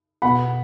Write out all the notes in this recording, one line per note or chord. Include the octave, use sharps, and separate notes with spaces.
B2 B3 F#5 B5